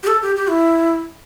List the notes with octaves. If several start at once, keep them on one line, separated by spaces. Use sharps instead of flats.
G4
A4
G4
G4
E4